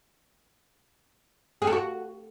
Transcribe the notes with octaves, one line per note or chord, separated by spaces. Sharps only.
G#4
A4
F#4